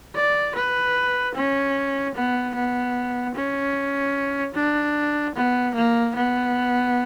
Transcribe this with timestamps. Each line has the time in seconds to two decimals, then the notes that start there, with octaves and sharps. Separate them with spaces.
0.16 D5
0.56 B4
1.35 C#4
2.15 B3
2.55 B3
3.35 C#4
4.55 D4
5.35 B3
5.75 A#3
6.16 B3